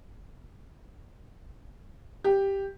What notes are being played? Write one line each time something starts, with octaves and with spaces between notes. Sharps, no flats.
G4